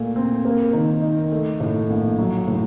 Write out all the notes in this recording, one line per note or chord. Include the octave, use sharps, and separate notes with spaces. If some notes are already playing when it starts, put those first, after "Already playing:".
Already playing: A#2 A3
C4
A#3
D#3
D#4
A3
A2
A#1
F#3
A2